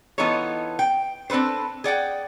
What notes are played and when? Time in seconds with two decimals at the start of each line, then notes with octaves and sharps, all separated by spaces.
0.18 E3 B3 D#4 F4 A4 C#5
0.79 G5
1.30 C4 D4 A4 B4 C5
1.84 G#4 D5 F#5 G5